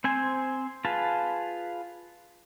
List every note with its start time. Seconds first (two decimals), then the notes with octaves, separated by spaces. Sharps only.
0.04 C4 C5 G#5
0.85 F4 G#4 B4 A5